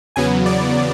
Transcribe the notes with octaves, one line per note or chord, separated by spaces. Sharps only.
E2 C#3 F#3 B3 G#5
D5